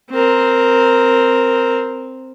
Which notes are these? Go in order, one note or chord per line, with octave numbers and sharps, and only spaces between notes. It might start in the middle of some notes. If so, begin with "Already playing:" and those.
C4 A#4